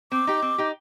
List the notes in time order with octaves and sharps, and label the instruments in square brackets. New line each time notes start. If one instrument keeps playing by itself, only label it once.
[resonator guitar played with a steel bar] C4 [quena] D6
[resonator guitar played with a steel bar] D#4 G4
C4
D#4 G4